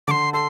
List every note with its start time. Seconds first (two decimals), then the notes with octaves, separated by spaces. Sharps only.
0.07 D3 C6 D6
0.33 A4 C6